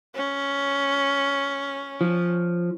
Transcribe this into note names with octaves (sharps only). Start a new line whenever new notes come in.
C#4
F3